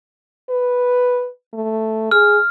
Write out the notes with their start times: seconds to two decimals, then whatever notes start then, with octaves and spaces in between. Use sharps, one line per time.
0.50 B4
1.54 A3
2.11 G#4 F6